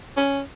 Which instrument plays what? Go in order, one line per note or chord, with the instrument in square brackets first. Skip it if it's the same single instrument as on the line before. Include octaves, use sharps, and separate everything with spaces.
[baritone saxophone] C#4